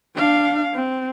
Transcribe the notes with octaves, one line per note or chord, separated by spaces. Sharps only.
D4 F5
C4